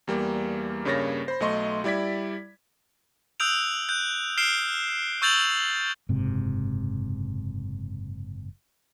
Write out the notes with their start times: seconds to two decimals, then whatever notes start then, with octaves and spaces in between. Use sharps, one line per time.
0.08 E2 G3 A#3
0.85 G2 C#3 A#3 C#5 A6 A#6
1.28 C5 B5
1.40 B1 A3 D#5 C6 C#6
1.84 G3 E4 D5 G#6 B6
3.40 D#6 E6 F#6 G6 D7 F7
3.89 F#6 G6
4.38 F6 C7 D7 E7 G7
5.22 C#6 E6 G6 A6 F7 F#7
6.09 F#1 G#2 C3